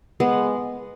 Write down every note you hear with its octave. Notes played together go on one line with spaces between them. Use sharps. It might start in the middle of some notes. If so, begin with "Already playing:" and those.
G#3 B3